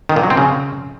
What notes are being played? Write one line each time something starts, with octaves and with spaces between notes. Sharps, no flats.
D#3
A#2
F#3
C4
C#3